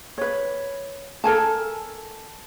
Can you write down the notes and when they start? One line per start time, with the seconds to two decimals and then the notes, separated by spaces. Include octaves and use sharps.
0.18 B4 C#5
1.24 A4 A#4 G#5 A5